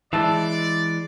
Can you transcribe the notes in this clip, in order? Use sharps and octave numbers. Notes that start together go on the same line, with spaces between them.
E3 G#3 D5 E5 A5